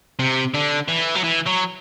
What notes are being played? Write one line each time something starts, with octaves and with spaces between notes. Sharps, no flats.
C3
D3
E3
F#3
E3
F#3